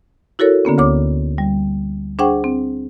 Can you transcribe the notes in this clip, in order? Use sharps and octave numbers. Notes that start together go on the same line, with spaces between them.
E4 F#4 A4 A#4 C#5
D3 A#3 B3 C#4
D2 C#5 D6
G3
D4 G#4 C5 F#5 G5 C#6
C4